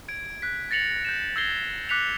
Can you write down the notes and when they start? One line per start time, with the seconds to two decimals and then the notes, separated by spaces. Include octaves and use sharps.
0.08 G#6 D7
0.42 F#6 B6
0.71 A6 A#6 C#7 F7 F#7
1.05 G6 E7
1.36 E6 G6 G#6 A#6 C7 G7
1.89 D6 F#6 B6 C#7 F7